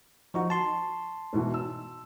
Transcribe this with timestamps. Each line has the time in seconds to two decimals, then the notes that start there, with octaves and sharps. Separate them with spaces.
0.34 F3 D#4 F#4 C#6
0.50 A5 C6
1.33 G#2 B2 E3
1.54 E6